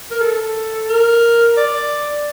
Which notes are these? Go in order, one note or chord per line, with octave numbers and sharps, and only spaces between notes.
A#4
A4
A#4
D5